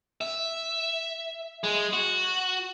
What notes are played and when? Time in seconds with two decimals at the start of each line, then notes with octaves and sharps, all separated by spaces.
0.21 E5
1.64 G#3
1.93 F#4